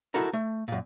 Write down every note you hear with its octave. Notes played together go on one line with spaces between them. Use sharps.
D#4 E4 F#4 A4 A#4 A#5
A3
F#2 A#2